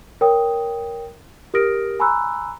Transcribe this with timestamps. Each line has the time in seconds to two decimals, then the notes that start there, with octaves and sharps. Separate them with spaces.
0.21 A#4 C#5 G5 D#6
1.54 G4 A#4 D#6 F6 A#6 D7
2.00 G#5 A#5 B5 C#6 E6 F#6